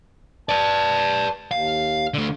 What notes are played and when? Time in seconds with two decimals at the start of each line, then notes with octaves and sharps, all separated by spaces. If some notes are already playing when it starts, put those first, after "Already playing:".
0.49 B4 D5 A5
1.51 D#2 F5
2.14 D3 A3